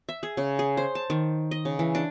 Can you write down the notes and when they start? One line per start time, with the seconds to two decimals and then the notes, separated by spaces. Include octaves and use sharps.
0.09 E5
0.23 G#4
0.37 C#3
0.59 G#4
0.77 C5
0.95 A5
1.10 D#3
1.51 D#5
1.65 C#3
1.79 E3
1.95 D4